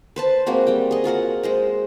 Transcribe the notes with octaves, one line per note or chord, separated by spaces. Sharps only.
B4 C5 A5
G#3 A#3 C4 F#4
G3 G5
G#4 D#5
F4 F#4 A#4 F#5
G#3 C5 D#5